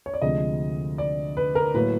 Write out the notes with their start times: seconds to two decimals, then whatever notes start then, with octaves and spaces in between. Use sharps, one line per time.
0.06 C#5
0.14 D5
0.22 D2 C3 F3 G#3 D#5
0.98 D5
1.37 B4
1.55 A#4
1.74 A2 F#3 A#3 B4